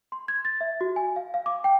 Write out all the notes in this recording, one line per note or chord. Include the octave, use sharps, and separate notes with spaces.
C6
G#6
A6
E5
F#4
G#5
F5
F5
D6
G5